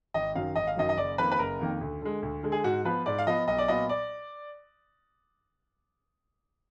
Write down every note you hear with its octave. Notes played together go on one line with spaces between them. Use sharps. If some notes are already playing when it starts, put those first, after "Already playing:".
G#1 D#5
F#2 D#3 F#3 F5
G#1 D#5
F5
F#2 D#3 F#3 D#5
D#5
F#1 D5
F2 D#3 A#3 B4
B4
F#1 A#4
F2 D#3 A#3
D2
D3 G#3
D2
D3 G#3
G#4
G#2 F#4
F3 B3 F4 B4
G#2 D5
F5
F3 B3 F4 D#5
B1 D#5
D5
A#2 F#3 B3 F4 D#5
D5